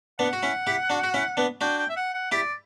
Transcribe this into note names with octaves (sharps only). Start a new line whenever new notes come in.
B3 D4 F#5
F#4
C#4 E4
E4 G4
D4 F#4
F#4
C#4 E4
B3 D4
D4 F#4 G5
G5
E5
F#5
F#5
E4 G4 D5